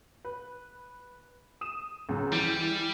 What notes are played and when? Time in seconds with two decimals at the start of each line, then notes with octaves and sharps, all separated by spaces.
0.25 B4
1.61 D#6 D#7 E7
2.09 C#2 F#2
2.32 E3 G3